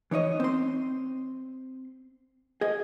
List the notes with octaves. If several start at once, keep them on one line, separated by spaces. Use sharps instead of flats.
E3 D#4 C#5 D#5
C4 C6
G#4 D#5